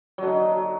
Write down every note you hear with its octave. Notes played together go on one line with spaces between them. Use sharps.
D3 F#3 D#4